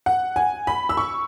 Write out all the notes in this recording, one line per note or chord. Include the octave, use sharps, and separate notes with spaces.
F#5
G#5
B5
E6
C#6